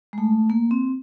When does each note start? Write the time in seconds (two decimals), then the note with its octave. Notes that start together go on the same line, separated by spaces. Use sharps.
0.13 G#3
0.18 A3
0.50 A#3
0.71 C4